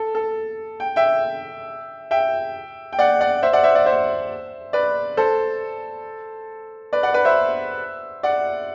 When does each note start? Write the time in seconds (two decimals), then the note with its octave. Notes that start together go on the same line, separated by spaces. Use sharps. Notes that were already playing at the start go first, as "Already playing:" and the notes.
Already playing: A4
0.15 A4
0.80 G5
0.96 E5 G5
2.11 E5 G5
2.93 G5
2.99 D5 F#5
3.21 D5 F#5
3.43 C5 E5
3.53 D5 F#5
3.64 C5 E5
3.75 D5 F#5
3.86 C5 E5
4.73 B4 D5
5.17 A4 C5
6.93 B4 D5
7.03 D5 F#5
7.14 B4 D5
7.25 C5 E5
8.23 D5 F#5